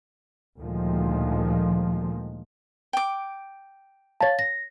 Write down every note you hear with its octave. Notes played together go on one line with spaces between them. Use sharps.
D2 A#2 D#3 F3 G#3
G5 D6
C#5 F5 A5 A6
A#6